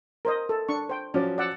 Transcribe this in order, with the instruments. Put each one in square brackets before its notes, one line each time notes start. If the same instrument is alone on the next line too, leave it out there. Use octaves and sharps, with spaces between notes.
[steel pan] A#4 C5 D#5
A4
D4 C#6
C5 G5
[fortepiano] F3 F#3 C#4 [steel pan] D5
[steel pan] D5 F#5 E6